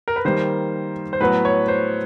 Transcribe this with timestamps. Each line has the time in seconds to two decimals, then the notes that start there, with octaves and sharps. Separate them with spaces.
0.08 A#4
0.16 B4
0.25 D#3 G3 A#3 C5
1.13 C5
1.21 A2 F#3 B3 B4
1.45 C#5
1.68 C5